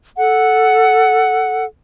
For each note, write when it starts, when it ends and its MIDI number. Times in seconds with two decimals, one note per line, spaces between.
0.18 1.65 69
0.18 1.65 78